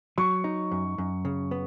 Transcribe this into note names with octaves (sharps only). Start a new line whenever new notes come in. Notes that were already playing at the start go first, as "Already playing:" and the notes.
F#3 C#6
D#4
F#2
F#2
C#3
B3